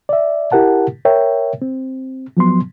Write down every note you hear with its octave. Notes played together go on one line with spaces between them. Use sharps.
D5 E5
E4 G4 A#4 F#5 A5
A#4 C#5 E5 G5
C4
F3 F#3 B3 C6